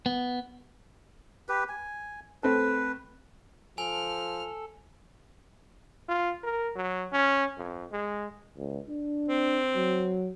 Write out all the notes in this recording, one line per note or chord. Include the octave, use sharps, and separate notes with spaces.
B3
G4 B4
G#5
A3 C4 A4 B4
F3 A4 G#5 F6
F4
A#4
F#3
C#4
F2
G#3
C#2
D4
C4
F#3